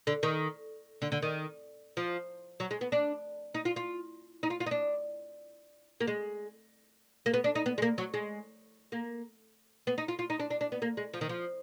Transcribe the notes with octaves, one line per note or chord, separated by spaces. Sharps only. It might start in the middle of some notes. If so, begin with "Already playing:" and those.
D3
D#3
D3
D3
D#3
F3
F#3
G#3
B3
D4
D#4
F4
F4
D#4
F4
F4
D#4
D4
A#3
G#3
A#3
B3
D4
D#4
B3
G#3
A#3
F#3
G#3
A#3
B3
D#4
F4
F4
D#4
D4
D4
D4
B3
A#3
G#3
F3
D#3
F3